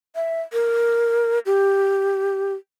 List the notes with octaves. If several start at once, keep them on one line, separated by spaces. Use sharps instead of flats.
E5
A#4
G4